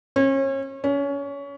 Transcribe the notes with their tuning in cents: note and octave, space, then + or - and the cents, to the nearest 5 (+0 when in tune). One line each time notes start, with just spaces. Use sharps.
C#4 -35
C#4 +25